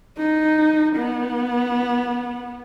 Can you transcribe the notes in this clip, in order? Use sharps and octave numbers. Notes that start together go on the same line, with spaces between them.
D#4
B3